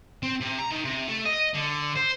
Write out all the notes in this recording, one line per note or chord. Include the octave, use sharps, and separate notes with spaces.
C4
C3
A#5
D#3
C3
A3
D#5
D3
C5